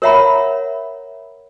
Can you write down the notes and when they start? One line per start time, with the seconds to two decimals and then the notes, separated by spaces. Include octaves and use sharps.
0.02 A#4 C#5 E5 F#5 A#5 B5